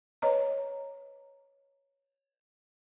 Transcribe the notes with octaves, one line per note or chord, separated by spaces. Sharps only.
B4 C#5 D#5 A#5